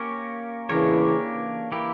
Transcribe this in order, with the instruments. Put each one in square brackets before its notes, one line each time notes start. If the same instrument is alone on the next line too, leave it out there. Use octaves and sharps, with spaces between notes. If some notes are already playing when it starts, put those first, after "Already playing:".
Already playing: [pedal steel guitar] A#3 C#4 G4 A#4 C#5
[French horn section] C#3 E3 [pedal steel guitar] A#3 D4 G4 A#4 C#5
[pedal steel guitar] E3 A#3 E4 G4